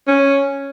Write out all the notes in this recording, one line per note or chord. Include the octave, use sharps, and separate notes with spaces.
C#4